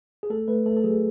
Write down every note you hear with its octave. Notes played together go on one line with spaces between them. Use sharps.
G#4
A3 A4
A3 B4
A3 A4
A4
F#3 G#4